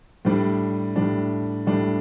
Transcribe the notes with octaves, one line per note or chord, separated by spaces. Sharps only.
A2 G3 D4
A2 G3 D4
A2 G3 D4